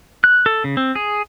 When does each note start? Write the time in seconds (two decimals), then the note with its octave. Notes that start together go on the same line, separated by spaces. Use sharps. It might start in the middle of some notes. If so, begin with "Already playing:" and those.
0.24 F#6
0.46 A4
0.64 C#3
0.77 C4
0.95 G#4